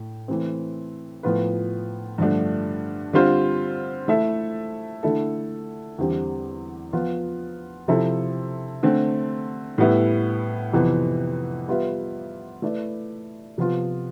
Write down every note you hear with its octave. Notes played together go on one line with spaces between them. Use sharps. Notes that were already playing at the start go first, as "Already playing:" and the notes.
Already playing: A2 A3
E3 A3 C4
A2 F3 B3 F4 B4
G2 D3 F3 A3 D4
D3 G3 C4 F4 C5
A3 E4 A4 E5
D3 A3 E4 A4
E2 D3 G3 C4 G4
F3 B3 F4
C3 F3 C4 E4 A4
D3 A3 C4
A2 G3 B3 E4
F2 C3 E3 B3
G3 B3 F4 B4 E5
A3 E4 B4 D5
C3 F3 B3 F4